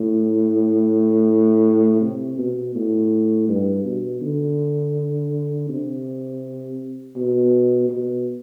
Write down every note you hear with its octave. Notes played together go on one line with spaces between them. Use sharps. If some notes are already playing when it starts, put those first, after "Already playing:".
Already playing: A2
C3
B2
A2
G2
B2
D3
C3
B2
B2